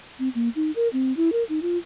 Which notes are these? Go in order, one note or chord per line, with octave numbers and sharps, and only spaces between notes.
C4
A#3
D#4
A#4
C4
E4
A#4
D#4
F4